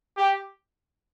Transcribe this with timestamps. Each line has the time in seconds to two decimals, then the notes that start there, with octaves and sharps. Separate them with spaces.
0.17 G4